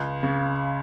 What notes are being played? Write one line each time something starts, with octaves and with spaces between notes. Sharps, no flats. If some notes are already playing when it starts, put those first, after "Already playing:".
Already playing: C#2
C#3